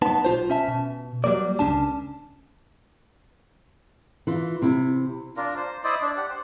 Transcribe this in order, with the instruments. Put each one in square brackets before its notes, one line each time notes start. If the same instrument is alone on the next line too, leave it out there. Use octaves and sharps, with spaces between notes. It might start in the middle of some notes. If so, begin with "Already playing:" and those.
[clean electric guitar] B3 D#4 A5
B1 F4 C5
C#4 E5 A5
B2
F#3 G3 A#3 D5
C#2 C3 C#4 D4 A5
[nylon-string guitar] E3 F4
C3 E4
[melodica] D4 F4 A#4
C5
E4 C5 D5 D#5
D4
G4 F#5
C5